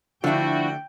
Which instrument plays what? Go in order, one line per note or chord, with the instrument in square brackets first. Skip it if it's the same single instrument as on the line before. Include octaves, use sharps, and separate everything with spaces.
[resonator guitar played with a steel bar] D3 A3 [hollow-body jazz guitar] F3 D4 E4 [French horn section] F#4 [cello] G5